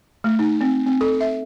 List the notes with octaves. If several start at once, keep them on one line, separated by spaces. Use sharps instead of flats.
A3
D#4
C4
C4
A4
E5